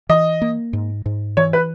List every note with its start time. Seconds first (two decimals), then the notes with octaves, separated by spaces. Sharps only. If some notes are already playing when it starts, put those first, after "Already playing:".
0.09 E3 D#5
0.42 A#3
0.73 G#2
1.06 G#2
1.37 E3 C#5
1.53 B4